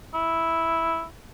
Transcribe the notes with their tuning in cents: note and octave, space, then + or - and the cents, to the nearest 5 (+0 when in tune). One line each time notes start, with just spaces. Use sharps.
E4 -5